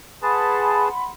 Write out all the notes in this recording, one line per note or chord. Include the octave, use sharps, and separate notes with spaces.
G#4 B4 F#5 A5 B5 C6